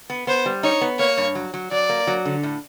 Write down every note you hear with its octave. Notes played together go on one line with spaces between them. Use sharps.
B3
B3 C5
G3
D#4 C#5
B3
A#3 C#5
G2
F#3
F#3
F#3 D5
A#3
F#3
D3
A2